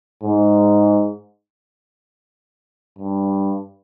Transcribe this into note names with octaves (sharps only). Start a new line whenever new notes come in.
G#2
G2